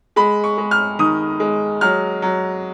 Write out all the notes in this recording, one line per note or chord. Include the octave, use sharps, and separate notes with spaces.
G#3 B5
C#6
G#3
F6
D#3 D#6
G#3
F#3 F6
F#3